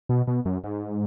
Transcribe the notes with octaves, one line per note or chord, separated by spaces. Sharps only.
B2
B2
F#2
G#2